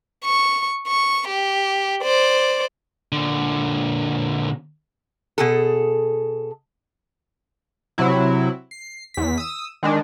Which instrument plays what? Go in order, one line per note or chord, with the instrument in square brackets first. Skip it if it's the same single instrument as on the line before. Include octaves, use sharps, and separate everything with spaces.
[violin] C#6
C#6
G4
C5 D5
[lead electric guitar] A#2 D3
[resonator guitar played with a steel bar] B2 G#4 A4
[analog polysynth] C3 F#3 E4
C7
E2 B6
D#6 E6
D#3 G#3 D4